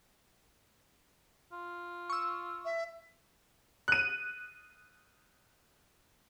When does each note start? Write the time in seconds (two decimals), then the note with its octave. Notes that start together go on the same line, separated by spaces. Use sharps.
1.52 F4
2.10 C#6 E6
2.65 E5
3.88 F#6 D#7